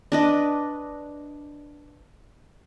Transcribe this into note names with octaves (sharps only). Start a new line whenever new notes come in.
D4 B4 D#5